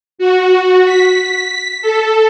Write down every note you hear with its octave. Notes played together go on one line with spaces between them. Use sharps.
F#4
B6
A4